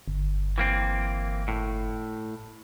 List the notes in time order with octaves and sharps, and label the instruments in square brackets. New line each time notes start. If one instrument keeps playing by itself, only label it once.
[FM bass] G1
[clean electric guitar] E3 A#3 C4
A2